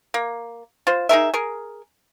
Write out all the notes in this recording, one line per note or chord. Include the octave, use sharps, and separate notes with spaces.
A#3
F4 C5
D#4 G#4 A#4 E5
G#4 A#4